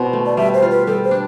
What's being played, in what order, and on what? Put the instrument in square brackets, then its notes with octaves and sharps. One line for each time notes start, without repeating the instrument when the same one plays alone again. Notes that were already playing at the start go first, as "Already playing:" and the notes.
Already playing: [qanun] B2 C4 E4
A3
[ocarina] D5
[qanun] G3 [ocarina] E5
[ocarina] C5
[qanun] F4
[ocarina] B4
[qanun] G3 [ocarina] A4
[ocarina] C5
[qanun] D4